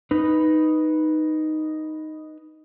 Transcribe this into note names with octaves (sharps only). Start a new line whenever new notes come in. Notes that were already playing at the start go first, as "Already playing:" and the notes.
D#4 B4